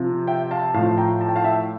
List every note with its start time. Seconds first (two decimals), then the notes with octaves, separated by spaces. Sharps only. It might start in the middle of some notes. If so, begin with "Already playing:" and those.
Already playing: C3 F3
0.27 E5 G5
0.51 F5 A5
0.74 A2 F3 F5 A5
0.97 G5 A#5
1.21 A5
1.28 G5
1.36 F5 A5
1.44 E5 G5